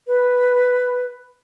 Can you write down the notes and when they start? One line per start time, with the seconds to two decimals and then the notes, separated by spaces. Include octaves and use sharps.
0.07 B4